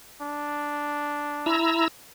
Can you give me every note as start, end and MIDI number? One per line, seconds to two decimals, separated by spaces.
0.21 1.62 62
1.46 1.88 64
1.46 1.88 82
1.46 1.88 88